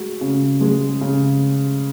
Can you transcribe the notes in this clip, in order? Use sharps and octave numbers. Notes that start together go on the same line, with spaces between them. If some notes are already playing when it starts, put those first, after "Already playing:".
Already playing: G#3 F#4
C#3
G#3 G#4
C#3